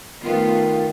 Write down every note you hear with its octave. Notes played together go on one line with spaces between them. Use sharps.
D#3 A3 B3 F4